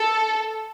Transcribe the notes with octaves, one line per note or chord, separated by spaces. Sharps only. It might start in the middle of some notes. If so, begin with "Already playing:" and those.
Already playing: A4